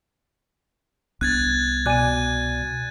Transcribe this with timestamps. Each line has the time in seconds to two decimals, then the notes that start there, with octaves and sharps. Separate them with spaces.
1.21 C2 B3 D4 F#6 G#6 A6
1.86 B2 D5 G#5 F#6 D#7